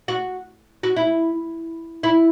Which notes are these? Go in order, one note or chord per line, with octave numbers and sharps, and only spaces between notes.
F#4
F#4
E4
E4